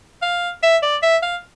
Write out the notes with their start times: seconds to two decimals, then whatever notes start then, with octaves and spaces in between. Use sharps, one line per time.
0.22 F5
0.63 E5
0.82 D5
1.03 E5
1.22 F5